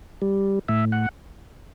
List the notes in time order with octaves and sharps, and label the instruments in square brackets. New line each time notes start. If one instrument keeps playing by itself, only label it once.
[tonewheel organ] G3
A2 E5
F#5